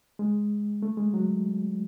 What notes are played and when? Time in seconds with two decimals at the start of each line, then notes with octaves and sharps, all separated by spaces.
0.19 G#3
0.82 A3
0.97 G#3
1.14 F#3